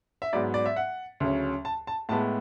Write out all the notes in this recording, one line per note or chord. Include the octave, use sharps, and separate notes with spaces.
E5
G#2 F#3 B3 D5
D5
E5
F#5
D2 C#3 F#3 C#4
A5
A5
A2 G#3 B3 A5